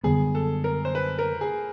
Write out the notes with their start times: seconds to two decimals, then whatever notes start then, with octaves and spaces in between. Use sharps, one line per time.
0.03 F#2 D3 G3 B3 G#4
0.35 A4
0.64 A#4
0.85 C5
0.95 B4
1.19 A#4
1.41 G#4